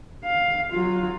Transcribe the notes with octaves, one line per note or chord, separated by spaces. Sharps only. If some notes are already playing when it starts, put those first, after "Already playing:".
F5
F#3 F4